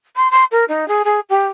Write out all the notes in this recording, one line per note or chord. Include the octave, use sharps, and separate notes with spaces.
C6
C6
A#4
D#4
G#4
G#4
G4